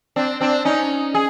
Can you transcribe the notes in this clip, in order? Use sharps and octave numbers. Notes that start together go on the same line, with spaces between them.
C4 D4
C4 D4
C#4 D#4
G#4